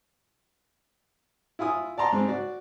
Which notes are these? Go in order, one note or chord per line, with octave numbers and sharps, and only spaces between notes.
E4 F4 G#5 D#6
D5 A5 A#5 C6
G#2 C4
F#4 D5